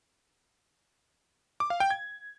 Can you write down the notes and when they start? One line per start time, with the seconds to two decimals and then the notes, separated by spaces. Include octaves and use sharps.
1.60 D6
1.70 F5
1.80 G5
1.90 G#6